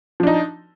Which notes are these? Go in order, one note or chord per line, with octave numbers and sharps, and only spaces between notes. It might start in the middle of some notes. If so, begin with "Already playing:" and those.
F3 D4 D#4